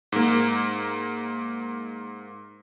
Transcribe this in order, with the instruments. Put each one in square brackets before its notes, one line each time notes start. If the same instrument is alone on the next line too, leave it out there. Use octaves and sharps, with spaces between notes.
[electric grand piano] G#2 A#3